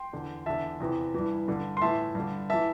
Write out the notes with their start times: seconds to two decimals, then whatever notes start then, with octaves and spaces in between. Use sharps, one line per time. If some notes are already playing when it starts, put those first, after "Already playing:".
Already playing: G5 C6
0.13 E2 D3
0.46 E2 D3 E5 A5
0.80 E2 C3 E3
1.14 G2 E3
1.48 G2 D3
1.77 C6
1.81 A2 E3 E5 A5
2.15 G2 D3
2.50 E3 E5 A5